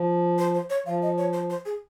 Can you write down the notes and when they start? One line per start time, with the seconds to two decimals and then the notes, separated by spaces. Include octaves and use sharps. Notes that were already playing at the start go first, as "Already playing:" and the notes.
Already playing: F3
0.38 C5
0.54 C5
0.70 C#5
0.86 F3 F5
1.02 D#5
1.18 C#5
1.33 C5
1.50 C5
1.65 G#4